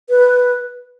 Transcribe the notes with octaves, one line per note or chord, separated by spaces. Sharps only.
B4